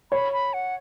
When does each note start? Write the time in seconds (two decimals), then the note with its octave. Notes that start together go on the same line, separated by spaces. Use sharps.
0.12 C#5 B5
0.33 B5
0.54 F#5